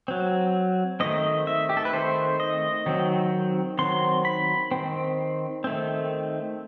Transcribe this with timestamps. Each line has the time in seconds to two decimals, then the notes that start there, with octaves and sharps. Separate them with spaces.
0.08 F#3 C4
1.00 D#3 A3 C4 D#5
1.47 E5
1.69 G4
1.77 A4
1.85 B4
1.93 D#3 A3 C4 C5
2.40 D#5
2.86 D#3 F#3 C4
3.79 D#3 F#3 C4 C6
4.25 B5
4.71 D#3 A3 C4
5.64 D#3 A3 C4